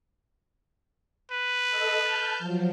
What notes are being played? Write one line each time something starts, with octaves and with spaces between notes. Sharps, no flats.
B4
A4 D#5 E6
A5 F6 G6
F3 F#3